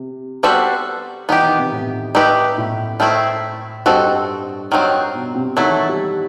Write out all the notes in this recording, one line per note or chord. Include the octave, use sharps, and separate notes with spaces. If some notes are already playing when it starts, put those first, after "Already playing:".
Already playing: C3
G3 B3 F#4 A4 C5
E3 B3 D#4 G4
D#3
C3
A2
A3 D#4 G4 B4
A2
D#3 A3 C4 E4
G2 C4 F#4 A4 D#5
D#3 F#3 C4
B2
C3
D#3 F#3 A3 E4 A4
E3
G3